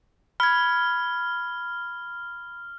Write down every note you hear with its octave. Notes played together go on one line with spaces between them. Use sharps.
B5 F6 G#6